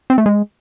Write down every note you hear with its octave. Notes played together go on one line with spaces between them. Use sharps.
C4
A3
G#3